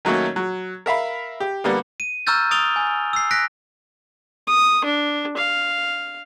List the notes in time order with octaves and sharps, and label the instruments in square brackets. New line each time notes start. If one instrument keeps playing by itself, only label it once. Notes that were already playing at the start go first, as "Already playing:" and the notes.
[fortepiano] D#3 F#3 A3 A#3 C#4
F#3
A#4 E5 F5 B5
G4
D3 G3 A#3 B3
[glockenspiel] D#7
A#5 C#6 E6 F6 G6 A6
A#5 D#6 A6 D7 F7 G7
G#5
E6 C7
F#6 A#6 B6 D7
[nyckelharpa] D#6
D4
F5